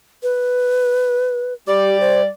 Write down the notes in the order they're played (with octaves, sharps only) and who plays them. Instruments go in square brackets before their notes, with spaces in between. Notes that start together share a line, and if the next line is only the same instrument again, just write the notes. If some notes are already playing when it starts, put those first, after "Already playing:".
[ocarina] B4
[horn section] G3 D5 [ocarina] G4
[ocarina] C5